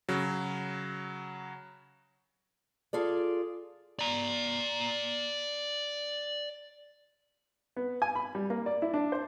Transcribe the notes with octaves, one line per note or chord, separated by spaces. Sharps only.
C#3 F#3
F4 G#4 A4 D5
D5 A#5
B3
G#5
B5
G3
A#3
D5
E4
D4
C5